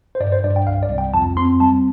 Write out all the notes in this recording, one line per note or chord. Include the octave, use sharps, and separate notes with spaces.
C5
G2 D5
C5
G2 D5
G5
C2 F5
D5
C2
G5
F2 A5
C4 C6
G3 A5